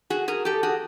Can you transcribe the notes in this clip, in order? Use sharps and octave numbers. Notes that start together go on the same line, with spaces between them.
F#4 G#4
G#4 A#4
G4 A4
F#4 G#4